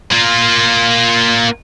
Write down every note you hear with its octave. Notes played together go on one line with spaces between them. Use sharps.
A#3 F4